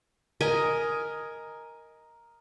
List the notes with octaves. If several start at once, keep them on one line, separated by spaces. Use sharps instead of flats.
A#4 D#5 G#5